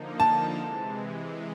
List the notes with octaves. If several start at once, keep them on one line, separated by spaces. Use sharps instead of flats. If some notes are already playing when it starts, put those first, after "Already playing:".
Already playing: D3 F3 A#3 D#4
A5
C3 E3 G#3